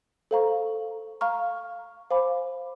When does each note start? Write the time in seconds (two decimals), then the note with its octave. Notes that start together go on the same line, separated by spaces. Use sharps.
0.31 A4 C5 F5 A#5 C#6
1.21 F5 A#5 C#6 F6
2.11 C5 F5 G#5 B5 D6